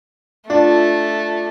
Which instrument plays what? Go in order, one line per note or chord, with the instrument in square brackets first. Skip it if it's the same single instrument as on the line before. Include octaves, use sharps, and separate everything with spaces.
[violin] A3 [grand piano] D4 [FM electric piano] F4